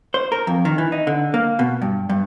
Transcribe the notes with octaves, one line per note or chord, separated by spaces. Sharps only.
C5
A#4
F2
D#3
E3
D#4
D3
A#3
B2
G2
G2